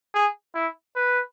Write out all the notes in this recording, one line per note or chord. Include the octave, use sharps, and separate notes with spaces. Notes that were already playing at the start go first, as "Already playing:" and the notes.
G#4
E4
B4